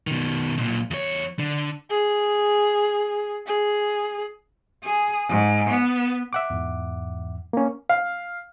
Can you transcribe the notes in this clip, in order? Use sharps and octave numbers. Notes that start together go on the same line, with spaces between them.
B2 D#3
B1 A#2
E2 C#5
D3
G#4
G#4
G#4
G#2
B3
E5 F#5 D6
E2 G#2 E3
A#3 C#4
F5